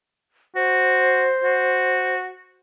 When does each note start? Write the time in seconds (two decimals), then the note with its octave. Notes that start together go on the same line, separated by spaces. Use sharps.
0.55 F#4 C5
1.44 F#4